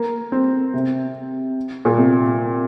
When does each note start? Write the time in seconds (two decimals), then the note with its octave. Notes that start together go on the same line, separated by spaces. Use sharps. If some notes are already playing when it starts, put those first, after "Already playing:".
Already playing: A#3
0.32 C4
0.74 C3
1.85 A#2
1.98 C3